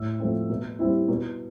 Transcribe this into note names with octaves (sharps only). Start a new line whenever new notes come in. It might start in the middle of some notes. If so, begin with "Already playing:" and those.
Already playing: A2 E6
F3 A3 C4
B2
G3 C4 E4
B2